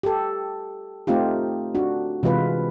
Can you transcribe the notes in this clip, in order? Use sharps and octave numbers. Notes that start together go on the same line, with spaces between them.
G4 A4
A3 C4 D#4 F4 G4
D4 F#4
C3 E3 G#3 F4 B4